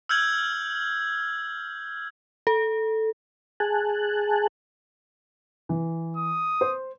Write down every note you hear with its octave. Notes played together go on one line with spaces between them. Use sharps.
E6 F6 G6 G#6 F#7
A4
G#4 G#5 A5 F#6
E3
D#6
C5